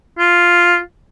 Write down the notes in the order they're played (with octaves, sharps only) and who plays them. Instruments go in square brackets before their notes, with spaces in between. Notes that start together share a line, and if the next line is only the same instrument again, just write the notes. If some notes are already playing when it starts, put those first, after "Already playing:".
[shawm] F4